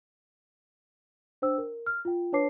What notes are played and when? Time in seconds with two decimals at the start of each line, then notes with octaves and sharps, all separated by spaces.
1.42 D4 C5 G5 E6
1.58 A#4
1.86 F6
2.05 F4 G5
2.32 D4 B4 C#5 A5 D6 C7